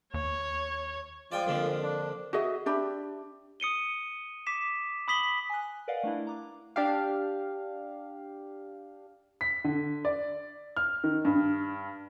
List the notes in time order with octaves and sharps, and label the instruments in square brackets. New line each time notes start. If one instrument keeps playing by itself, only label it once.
[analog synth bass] D#2 [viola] C#5
[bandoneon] F3 G#3 F4 [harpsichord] D5 G5 G#5
[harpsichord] F2 D3 A#3
[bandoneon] D4
[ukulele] F#4 G#4 D#5 E5
D4 G4 E5 B5
[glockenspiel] D#6 C#7 D#7 G7
D6 B6 E7
B5 D#6 B6 F#7 G7
[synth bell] G#5 D#6 F#6
A#4 B4 D5 D#5 F5 F#5
A3 D4 E4
A#5 D6
[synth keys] D4 G4 F5
[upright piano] B6
D3
D5
F6
D#3
G2